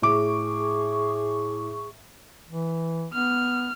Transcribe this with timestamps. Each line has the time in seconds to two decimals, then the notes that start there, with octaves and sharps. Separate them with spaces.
0.02 A2 G#4 C#6 D6
2.48 E3
3.13 B3 F6